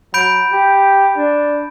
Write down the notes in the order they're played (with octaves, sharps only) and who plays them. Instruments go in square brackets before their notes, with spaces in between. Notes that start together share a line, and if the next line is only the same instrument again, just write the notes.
[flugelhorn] F#3 [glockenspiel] B5 G6 D7
[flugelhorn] G4
D4